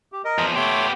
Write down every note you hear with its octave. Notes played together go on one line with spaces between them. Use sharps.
G4
A#4 D#5
E2 F3
A3 B3 G4 C#5 C6